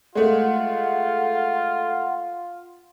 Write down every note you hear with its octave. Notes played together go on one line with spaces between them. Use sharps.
G#3 A3 F4 F#5